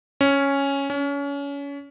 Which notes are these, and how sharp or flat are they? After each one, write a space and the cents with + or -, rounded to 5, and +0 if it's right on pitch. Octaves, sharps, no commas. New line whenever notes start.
C#4 +0
C#4 +30